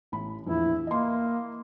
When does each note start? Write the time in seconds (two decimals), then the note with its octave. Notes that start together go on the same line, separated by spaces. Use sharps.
0.12 A1 B5
0.47 A#1 E2 E4
0.87 A#3 D#5 C6